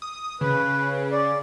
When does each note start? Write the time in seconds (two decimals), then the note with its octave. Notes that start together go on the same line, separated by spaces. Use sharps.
0.02 D#6
0.41 C#3 B4
1.12 D5